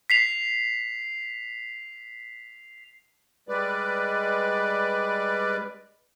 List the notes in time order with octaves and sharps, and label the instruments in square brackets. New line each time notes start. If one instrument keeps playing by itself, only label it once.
[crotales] B6 C7 F7
[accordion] G3 G#3 B4 D5